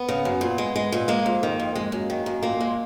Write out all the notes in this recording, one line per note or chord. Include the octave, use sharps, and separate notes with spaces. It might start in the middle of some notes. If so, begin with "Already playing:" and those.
Already playing: B3
C#3
F#2
A#2
G#3
G#3
A#2
G#3 A#3
F2
D#3
F2
G#3
F#2
D#3
F#2
A#2 A#3
G#3